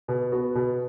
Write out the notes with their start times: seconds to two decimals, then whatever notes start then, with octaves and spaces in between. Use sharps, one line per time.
0.08 B2
0.32 B3 F#4
0.55 B2